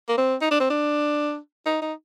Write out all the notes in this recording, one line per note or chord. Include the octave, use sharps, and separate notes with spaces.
A#3
C4
D#4
D4
C4
D4
D#4
D#4